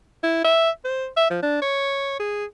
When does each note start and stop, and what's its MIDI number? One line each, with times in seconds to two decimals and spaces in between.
0.23 0.42 64
0.44 0.70 76
0.85 1.07 72
1.17 1.27 76
1.30 1.40 53
1.43 1.61 62
1.62 2.17 73
2.20 2.45 68